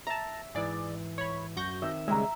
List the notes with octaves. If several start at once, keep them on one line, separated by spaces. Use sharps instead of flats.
E5 A5 A#5
G#2 E3 G#4 D5
C#5 B5
F#2 F#4 C#6 G6 A#6 C#7
D#3 C4 E5
C#3 G3 G#3 E5 A#5